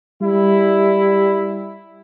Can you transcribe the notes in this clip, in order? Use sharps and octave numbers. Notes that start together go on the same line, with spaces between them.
G3 E4